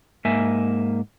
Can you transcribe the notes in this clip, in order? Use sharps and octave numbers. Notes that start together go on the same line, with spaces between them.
G#2 A#3 E5 G#5